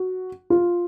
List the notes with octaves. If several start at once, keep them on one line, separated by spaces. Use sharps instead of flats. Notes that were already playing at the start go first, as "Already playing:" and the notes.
Already playing: F#4
F4